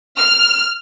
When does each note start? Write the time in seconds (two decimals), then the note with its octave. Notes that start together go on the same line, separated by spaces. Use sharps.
0.21 F6